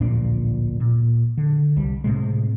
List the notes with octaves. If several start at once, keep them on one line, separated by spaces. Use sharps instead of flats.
D1 A#1 A#2 D4
A#2
D3
C2 G3
A2 C3 G#3